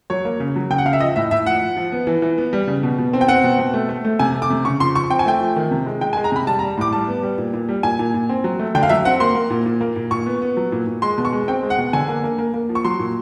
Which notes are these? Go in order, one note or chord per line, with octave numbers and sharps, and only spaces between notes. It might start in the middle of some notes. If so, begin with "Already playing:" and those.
F#3 C#5
A#3
C#3
F#3
C#3 G5
F#5
C#3 F5
E5
F3 D#5
A2 E5
A2 E5
F3 F#5
F3
F3
B3
E3
E3
B3
G3
C#3
B2
B2
C4
G5
C4 F#5
B2
B2
A3
A3
A3
C3 G#5
A3
D6
C3
C#3 C#6
F3 C6
F3 C#6
C4 G5
G#5
A3 G5
F3
D#3
C3
G#3
G#3 G5
G#5
G#3
A#5
C3 B5
G3 A5
A#5
G3
A2 D6
G3 A5
B3
G3
A#2
A#2
G3
A#2 G#5
A#2
A#2
C4
F#3
A3
D3 G5
F5
F#3 E5
C4 F#5
A#3 C6
A#3
A#2
A#2
A#3
A#2
A#2 C#6
B3
B3
F#3
A#2
A#2
G#3 C6
B2
C#6
G#3
C4 G5
G#3
F#5
B2
D3 G#5
A#3
A#3
A#3
A#3
F3
C#6
F#3 C6
A#2